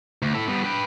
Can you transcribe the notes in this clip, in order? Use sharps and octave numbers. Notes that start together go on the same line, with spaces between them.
D2
E4 A4
G3 B3
B4 G5